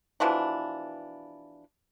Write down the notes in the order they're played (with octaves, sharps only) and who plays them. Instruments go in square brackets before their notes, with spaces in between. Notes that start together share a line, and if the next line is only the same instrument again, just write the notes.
[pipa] B2 E3 F3 D4